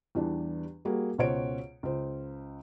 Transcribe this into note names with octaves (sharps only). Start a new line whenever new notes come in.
E2 E3 G3 D4
G3 A#3 F#4 G#4
C#2 B2 C5 C#5 F#5 D7
C#2 C5